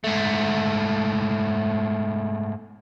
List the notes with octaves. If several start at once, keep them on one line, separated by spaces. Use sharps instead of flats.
G#2 A3